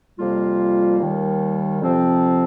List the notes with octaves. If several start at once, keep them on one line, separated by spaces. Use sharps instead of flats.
F2 C3 G3 A#3 F4
D#2 D#3 G3
F2 C3 F3 C4